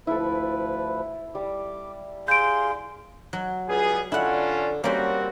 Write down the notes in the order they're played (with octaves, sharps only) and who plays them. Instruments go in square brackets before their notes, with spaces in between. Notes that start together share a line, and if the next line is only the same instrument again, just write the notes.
[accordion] D2 F3 B4 [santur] E4 A4
[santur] G3 [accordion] D6
[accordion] G#4 F5 [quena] C6 [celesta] G6 D7
[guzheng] F#3
[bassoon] C#2 [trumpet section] G3 B3 G#4
[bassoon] D3 [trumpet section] C#4 D4 F4 [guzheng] E4 F#5
[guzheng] G3 A#3 [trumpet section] C4 F#4 [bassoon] C#4